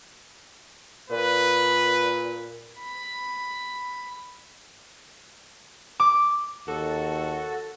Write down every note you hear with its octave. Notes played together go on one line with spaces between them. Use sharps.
A#2 B4
B5
D6
D#2 F#4 A4